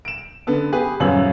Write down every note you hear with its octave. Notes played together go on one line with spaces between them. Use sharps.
D7 E7
D3 B3 A4
G4 G#4 B4
D#1 F#2 B3 C#5 E6 F#7